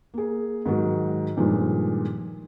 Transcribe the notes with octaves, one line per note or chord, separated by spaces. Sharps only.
A#3 G#4
G#2 D#3 F#3
G2 A#2 D#3 F3 G#3